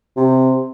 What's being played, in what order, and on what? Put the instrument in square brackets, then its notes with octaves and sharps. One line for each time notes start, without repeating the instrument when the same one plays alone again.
[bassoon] C3